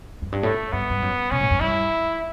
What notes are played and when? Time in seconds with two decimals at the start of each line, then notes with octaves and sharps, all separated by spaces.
0.22 F#2
0.32 G2
0.43 A2 A3
0.72 G2 B3
0.90 G2
1.02 F#2
1.31 B2 C#4
1.41 A2
1.51 F#2
1.60 G2 E4